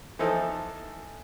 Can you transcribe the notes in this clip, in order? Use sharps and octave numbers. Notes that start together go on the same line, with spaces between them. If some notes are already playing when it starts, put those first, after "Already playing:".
E3 F3 D#4 A4